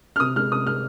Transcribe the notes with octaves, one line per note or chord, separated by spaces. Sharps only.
F6
C3 D#6
G#3 F6
C3 D#6
G#3 F6